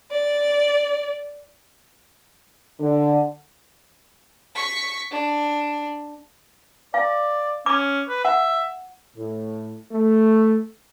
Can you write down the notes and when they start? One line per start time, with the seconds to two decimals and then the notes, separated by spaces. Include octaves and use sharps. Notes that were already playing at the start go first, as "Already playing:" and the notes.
0.10 D5
2.80 D3
4.55 C#6 B6
5.11 D4
6.94 D5 F5
7.66 C#4 D6
8.09 B4
8.25 E5 F#5
9.15 A2
9.91 A3